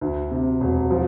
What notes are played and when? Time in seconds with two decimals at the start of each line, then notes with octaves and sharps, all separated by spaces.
0.01 D2
0.31 C3
0.61 E1
0.91 F3